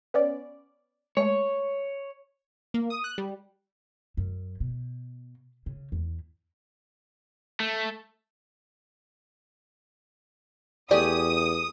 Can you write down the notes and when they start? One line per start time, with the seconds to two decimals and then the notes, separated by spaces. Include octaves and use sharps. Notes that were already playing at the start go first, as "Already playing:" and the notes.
0.14 B3 C#4 D5
1.17 G#3 A3 C#5
2.74 A#3
2.90 D#6
3.04 F#6
3.18 G3
4.17 F#2
4.60 B2
5.66 C#3
5.92 E2
7.60 A3
10.91 E2 A3 G4 D5 G#5 D#6